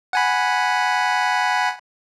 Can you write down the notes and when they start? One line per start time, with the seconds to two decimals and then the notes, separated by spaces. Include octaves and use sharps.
0.13 F#5 G#5 B5